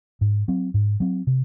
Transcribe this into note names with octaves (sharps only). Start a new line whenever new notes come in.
G#2
F#3 C4
G#2
F#3 C4
C3